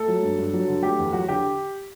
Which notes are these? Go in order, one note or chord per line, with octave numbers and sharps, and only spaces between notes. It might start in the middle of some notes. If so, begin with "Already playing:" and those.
Already playing: A3 A4
F#3
G2
G2
F#3
D3
A3 G4
E2
F#3 F#4
D3 G4